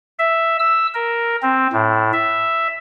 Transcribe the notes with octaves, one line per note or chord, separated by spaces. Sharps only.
E5
E6
A#4
C4
A2
E5